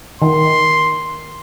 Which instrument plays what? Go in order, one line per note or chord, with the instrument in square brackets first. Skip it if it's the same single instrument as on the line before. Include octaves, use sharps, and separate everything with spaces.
[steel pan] D#3 [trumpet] C6